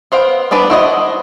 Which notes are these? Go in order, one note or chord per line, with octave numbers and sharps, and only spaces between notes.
B3 C5 F5 G5
G3 B3 D4 B4
E4 F#4 C5 C#5 D#5